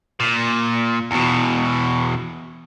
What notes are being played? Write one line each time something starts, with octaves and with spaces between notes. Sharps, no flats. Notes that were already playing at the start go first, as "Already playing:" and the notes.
A#2
E2 B2